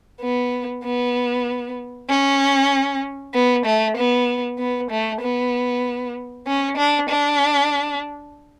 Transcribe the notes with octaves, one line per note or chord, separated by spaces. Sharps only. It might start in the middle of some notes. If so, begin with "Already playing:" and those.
B3
B3
C#4
B3
A3
B3
B3
A3
B3
C#4
D4
D4